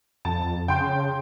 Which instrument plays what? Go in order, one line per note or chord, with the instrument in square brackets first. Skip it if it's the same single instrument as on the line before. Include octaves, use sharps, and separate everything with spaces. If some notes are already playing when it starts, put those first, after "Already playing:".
[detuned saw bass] F2 [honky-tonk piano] A5
[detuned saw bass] C#3 [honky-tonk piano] G5 C6 G6